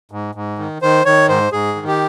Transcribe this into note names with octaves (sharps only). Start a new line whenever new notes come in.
G#2
G#2
D#3
D#3 C5
D#3 C#5
G#2 C5
G#2 G#4
D#3
G4